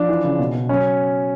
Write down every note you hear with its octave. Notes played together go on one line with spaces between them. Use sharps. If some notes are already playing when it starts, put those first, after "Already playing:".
Already playing: F3 D4
E3
C#3
B2
B2
F#3 C#4